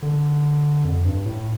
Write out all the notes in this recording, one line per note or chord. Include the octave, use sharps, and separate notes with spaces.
D3
F2
G2
A2